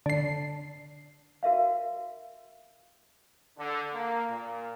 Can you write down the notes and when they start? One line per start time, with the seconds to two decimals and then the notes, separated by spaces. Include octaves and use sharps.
0.06 D3 C7
1.43 F#4 A#4 E5 F5
3.58 D3
3.93 A#3
4.29 A#2